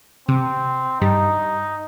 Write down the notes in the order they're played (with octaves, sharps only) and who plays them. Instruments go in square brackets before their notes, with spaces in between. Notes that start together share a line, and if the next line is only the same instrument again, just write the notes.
[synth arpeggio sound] C3 [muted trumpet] C4
[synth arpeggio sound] G2 G3 [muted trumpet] D#4